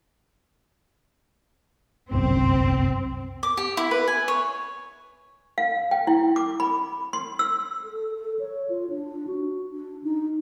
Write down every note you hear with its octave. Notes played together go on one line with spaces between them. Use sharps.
G1 C2 F#2 C4
D6
G4
E4
B4
G#5
C#5
F5
G5
E4
D6
B5
C6
E6
A4
A4
C#5
F4
D4
F#4
D4
D#4